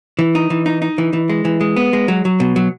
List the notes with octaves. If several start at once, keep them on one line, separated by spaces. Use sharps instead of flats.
E3
D#4
E3
D#4
D#4
E3
E3
G#3
E3
G#3
B3
G#3
F#3
F#3
B2
F#3